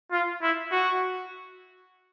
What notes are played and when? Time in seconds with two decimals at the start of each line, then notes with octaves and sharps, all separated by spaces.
0.11 F4
0.42 E4
0.72 F#4